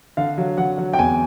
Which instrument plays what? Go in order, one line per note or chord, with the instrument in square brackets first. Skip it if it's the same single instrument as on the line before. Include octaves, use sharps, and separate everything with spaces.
[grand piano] D3 [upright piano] F5
[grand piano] F#3
[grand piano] F#3 [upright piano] F#5
[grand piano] F#3
[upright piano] G5
[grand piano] E2 [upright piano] G#5